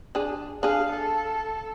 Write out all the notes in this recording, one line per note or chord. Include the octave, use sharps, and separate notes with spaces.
D4 G#4
D4 G#4 F5
A4